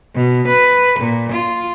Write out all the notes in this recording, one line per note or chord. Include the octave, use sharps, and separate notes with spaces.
B2
B4
A#2
F4